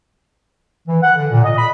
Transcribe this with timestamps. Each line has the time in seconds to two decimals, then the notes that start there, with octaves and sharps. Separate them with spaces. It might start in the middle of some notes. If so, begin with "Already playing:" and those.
0.87 E3
1.03 F#5
1.17 D3
1.31 A#2
1.44 D#5
1.57 B5